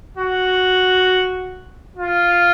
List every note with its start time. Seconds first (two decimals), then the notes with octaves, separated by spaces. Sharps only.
0.17 F#4
1.96 F4